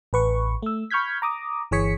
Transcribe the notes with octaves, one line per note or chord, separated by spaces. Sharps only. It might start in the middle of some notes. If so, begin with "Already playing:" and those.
A1 B4 C#6
A3 E6
B5 C#6 F6 G6 G#6 B6
A#5 D6 D#6
G1 E3 G#4 C#5 B6 C#7